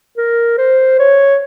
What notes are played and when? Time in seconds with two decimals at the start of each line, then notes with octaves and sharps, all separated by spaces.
0.17 A#4
0.58 C5
0.99 C#5